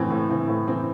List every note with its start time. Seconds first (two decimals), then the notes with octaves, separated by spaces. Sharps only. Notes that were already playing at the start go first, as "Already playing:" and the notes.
Already playing: A2 E3 C4
0.10 A2
0.29 E3 C4
0.48 A2
0.67 E3 C4